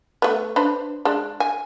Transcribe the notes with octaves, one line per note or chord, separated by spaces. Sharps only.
A3 B3
D4 B4 C5
G#3 D4
G#5